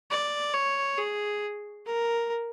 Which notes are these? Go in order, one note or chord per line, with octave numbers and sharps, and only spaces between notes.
D5
C#5
G#4
A#4